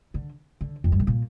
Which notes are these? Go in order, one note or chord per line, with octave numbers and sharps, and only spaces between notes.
D3
D3
F2
G2
A2
A#2